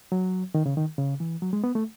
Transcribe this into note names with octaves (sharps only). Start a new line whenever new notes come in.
F#3
D#3
C#3
D#3
C#3
E3
F#3
G#3
B3
A3